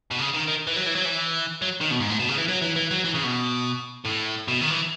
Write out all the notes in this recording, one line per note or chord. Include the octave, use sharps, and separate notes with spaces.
B2
C#3
D#3
D#3
E3
F#3
E3
F#3
E3
F#3
D#3
B2
G#2
A2
B2
C#3
E3
F#3
E3
E3
F#3
E3
C#3
B2
A2
B2
D#3
E3